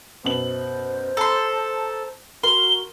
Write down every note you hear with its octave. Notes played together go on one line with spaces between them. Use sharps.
F#2 B2 C5 F#7
A4 A5 A#5 C6
F#4 A#4 C6 G7